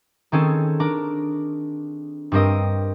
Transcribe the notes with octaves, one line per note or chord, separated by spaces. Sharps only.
D#3 C4 C#4 G#4 A4
D4 A#4 D6
G2 G3 C4 A#4 D#5 D#6